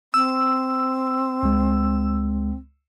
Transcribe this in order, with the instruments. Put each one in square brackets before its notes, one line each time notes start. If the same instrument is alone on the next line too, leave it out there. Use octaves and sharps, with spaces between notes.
[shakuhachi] C4 [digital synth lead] E6
[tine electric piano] C#2 G#3